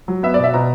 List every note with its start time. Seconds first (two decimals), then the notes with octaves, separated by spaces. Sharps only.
0.08 F#3
0.23 B3 E5
0.34 B2 D5
0.44 E5
0.54 B2 A#5